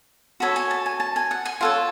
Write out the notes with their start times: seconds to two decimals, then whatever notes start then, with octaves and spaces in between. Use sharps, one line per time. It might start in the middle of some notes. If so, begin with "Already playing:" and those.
0.40 F#4 A4 C#5 B5
0.56 G#5
0.71 A5
0.86 G#5
1.00 A5
1.16 G#5
1.31 F#5
1.45 G#5
1.61 F4 A4 C#5 F#5